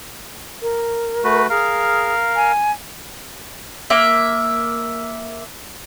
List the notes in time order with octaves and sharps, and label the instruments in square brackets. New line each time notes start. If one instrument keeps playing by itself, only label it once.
[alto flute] A#4
[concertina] A3 F#4 B4
[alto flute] G#4 [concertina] A#4 F5
[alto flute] G#5
[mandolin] A#3 E5